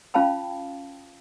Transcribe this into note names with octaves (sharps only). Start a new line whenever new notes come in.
C#4 F4 F5 G5 A5 B5